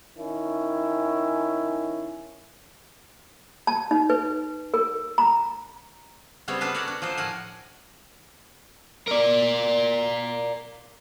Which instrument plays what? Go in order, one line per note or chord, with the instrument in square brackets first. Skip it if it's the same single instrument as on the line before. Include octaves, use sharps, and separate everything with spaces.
[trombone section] D#3 C#4 E4
[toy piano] A5
D#4
B4
A#4
A#5
[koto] C#3 G3 B3 C4 C5 C#5
B3 D4 A4 B4 F5
F#4 A#4 C#5 D5 F#5
D4
F3 A#3 A4 C5
A2 A#4 F#5 G#5
[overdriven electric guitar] A#4 D5